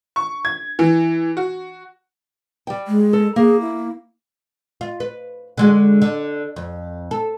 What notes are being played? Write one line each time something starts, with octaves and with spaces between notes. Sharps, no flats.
C#6
G#6
E3
F#4
G3 G5
G#3
A4
A#3 G#4
E4
F4
B4
D3 G#3 F#4
D3
F2
A4